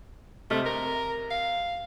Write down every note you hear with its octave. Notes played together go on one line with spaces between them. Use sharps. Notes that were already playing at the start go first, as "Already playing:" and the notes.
C3 A3 D#5 F6
A#4
F5